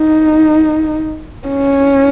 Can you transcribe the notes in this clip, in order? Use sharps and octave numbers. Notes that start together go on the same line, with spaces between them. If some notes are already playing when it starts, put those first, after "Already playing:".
Already playing: D#4
C#4